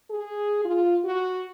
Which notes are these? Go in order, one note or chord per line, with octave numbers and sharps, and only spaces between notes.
G#4
F4
F#4